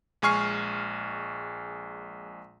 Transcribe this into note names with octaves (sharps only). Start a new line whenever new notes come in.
A#1 G#3 G#5 C#6 F6 C7